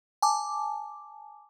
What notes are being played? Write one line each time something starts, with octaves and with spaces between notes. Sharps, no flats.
G#5 A5 D6